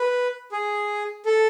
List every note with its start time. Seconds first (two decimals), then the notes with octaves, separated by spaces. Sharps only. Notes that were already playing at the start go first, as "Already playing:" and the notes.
Already playing: B4
0.52 G#4
1.26 A4